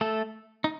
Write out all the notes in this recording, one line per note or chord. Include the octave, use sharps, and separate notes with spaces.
A3 A4
D#4